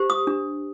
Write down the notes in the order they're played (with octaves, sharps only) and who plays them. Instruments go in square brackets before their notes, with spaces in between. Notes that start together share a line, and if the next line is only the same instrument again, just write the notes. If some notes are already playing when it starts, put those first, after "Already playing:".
Already playing: [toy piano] G4 C5
D#6
D4